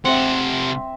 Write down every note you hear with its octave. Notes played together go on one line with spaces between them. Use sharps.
C3 C4 E5 F#5